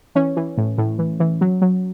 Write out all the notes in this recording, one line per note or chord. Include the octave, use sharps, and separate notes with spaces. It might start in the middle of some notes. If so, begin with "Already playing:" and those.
E3 C#4
E3
A2
A2
E3
E3
F#3
F#3